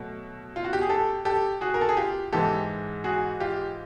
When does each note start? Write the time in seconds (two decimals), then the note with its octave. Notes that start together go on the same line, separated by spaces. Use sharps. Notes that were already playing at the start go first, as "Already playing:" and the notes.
Already playing: B2 F#3 A3
0.56 F4
0.64 F#4
0.73 G4
0.81 G#4
0.89 G4 A4
1.25 G4 A4
1.61 F#4 G#4
1.74 A#4
1.81 A4
1.89 G#4
1.97 F4 G4
2.32 G#2 E3 G#3 G4 A4
3.04 F#4 G#4
3.40 F4 G4